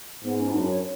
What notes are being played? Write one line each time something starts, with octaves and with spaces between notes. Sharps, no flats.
G#2 B3
C#4
E4
F#2 D4
C#5